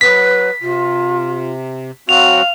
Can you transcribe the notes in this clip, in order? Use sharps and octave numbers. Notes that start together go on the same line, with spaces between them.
F#3 B4 B6
C3 F4
F#3 C4 F#4 F5 F7